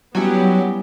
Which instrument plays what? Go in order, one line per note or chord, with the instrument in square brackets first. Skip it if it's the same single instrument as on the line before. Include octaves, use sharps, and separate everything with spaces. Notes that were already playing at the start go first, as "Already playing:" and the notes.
[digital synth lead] F#3 [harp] G3 C#4 E4 [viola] B3 G4